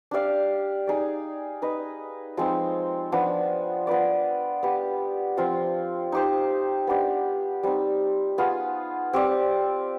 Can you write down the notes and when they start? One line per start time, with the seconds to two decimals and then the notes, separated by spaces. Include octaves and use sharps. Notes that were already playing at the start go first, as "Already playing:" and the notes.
0.11 D4 G4 D5 F5
0.87 D#4 G#4 D5
1.62 D#4 B4 D#5
2.37 F3 G#3 C4 D#4
3.12 F3 B3 D4
3.87 B3 F4 B4 D5
4.63 B3 D4 G4
5.37 F3 C4 F4
6.12 D#4 G4 C5
6.87 B3 D4 G4
7.63 G3 C4 D#4
8.38 B3 F4 G#4
9.13 C4 G4 D5